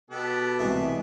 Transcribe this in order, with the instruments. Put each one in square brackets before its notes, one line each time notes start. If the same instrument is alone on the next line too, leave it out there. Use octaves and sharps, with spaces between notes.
[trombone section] B2 [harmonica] B3 G4 A4
[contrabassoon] C2 [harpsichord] E3 G#3 A3 [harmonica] E5